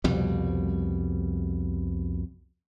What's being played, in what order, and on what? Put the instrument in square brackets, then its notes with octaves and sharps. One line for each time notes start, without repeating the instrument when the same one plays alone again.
[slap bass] C2 F2 B2 G3